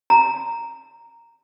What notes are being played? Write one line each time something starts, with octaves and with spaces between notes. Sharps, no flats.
A#5